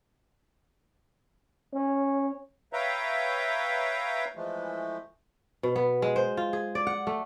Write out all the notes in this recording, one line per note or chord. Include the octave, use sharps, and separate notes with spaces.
C#4
B4 C#5 E5 F5 G5 A#5
E3 F3 G#3 A3
B2
B3
G#3
C5
F4
G#4
D5
F#5
A3